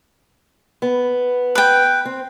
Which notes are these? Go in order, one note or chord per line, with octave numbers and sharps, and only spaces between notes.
B3
B4 G5
C4